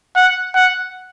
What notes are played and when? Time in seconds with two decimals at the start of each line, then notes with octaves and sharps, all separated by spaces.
0.16 F#5
0.55 F#5